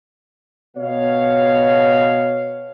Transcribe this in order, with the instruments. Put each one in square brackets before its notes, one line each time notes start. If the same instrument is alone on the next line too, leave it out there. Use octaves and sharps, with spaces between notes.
[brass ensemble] B2 C#5 F5